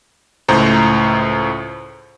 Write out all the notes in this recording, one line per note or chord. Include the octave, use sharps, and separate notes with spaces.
C#2 A2 C5 A#5